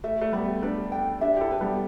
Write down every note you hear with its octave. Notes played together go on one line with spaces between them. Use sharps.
A3 E5
A3
G3 B3 B4
A3 D4 B4
G5
D4 G4 E5
G4
E4 A4
B4
G3 B3